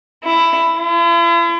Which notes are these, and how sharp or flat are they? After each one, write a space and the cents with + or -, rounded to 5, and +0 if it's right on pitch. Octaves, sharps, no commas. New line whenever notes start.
E4 +10
E4 +45